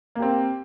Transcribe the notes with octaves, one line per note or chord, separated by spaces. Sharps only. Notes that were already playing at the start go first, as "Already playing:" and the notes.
A#3 C4 G4